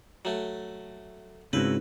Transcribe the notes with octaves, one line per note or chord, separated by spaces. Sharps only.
F#3 A3
G#2 C#3 C4 E4 F#4 B4